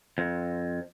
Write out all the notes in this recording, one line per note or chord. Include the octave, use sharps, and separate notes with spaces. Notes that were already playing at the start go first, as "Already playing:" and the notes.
F2